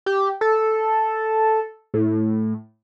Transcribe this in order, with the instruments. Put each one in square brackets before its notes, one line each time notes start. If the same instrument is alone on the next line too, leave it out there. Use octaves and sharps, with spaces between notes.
[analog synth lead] G4
A4
A2